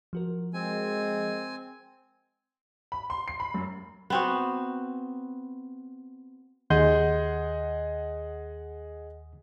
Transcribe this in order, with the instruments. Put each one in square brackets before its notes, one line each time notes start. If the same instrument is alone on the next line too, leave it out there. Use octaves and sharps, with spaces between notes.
[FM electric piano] F3 F#4 A#4
[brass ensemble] G#3 [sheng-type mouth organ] C4 G#5
[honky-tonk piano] B5
C6
C7
B5
F#2
[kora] B3 C4 F#4
[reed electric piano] D#2 C6 G6 [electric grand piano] G#4 D#5 F#5